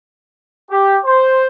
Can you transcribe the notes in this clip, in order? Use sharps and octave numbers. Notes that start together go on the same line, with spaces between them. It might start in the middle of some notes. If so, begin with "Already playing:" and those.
G4
C5